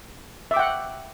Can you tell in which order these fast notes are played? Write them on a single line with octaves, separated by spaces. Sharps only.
E5 D6 G5 F#5